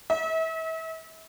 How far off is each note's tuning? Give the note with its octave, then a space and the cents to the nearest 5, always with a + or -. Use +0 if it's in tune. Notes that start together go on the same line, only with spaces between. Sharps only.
E5 -35